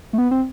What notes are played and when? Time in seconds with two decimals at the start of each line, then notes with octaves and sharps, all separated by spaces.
0.13 A3
0.18 B3
0.31 C4